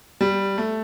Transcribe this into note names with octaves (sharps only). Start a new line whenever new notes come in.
G3
A3